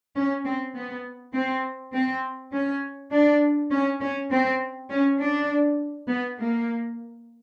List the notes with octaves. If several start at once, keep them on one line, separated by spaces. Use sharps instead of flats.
C#4
C4
B3
C4
C4
C#4
D4
C#4
C#4
C4
C#4
D4
B3
A#3